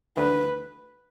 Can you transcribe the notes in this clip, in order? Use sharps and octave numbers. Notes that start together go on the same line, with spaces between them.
D2 B4